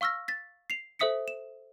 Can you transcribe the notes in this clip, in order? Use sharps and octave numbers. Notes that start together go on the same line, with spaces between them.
F5 C#6 E6 F6 A#6
A6 B6
C7 F7
A4 C5 E5 D#6 B6 C#7
E7